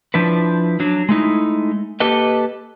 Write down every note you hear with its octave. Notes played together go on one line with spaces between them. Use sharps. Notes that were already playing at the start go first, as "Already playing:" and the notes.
F3 D4 E4 B4
F#3 D4
G#3 A3 D#4 E4
A#3 G4 A4 B4 D#5